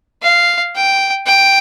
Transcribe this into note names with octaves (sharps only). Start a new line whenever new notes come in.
F5
G5
G5